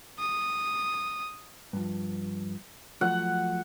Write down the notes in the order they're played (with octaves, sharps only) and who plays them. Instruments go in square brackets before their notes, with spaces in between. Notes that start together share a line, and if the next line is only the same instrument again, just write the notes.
[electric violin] D#6
[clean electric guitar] G2 F3
[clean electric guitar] F3 F#3 A3 [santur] F#5